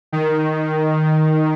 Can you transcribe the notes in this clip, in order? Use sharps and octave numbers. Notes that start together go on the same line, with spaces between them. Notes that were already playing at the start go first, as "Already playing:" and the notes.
D#3